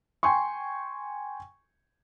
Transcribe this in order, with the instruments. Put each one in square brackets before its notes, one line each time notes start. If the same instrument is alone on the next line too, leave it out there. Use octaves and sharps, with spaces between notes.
[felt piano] G5 G#5 C6 C#6